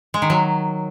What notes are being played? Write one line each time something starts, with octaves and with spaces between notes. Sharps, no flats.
G#3
D#3
F#3